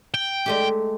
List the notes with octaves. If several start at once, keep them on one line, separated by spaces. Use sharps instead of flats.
G5
G#3 A3 G4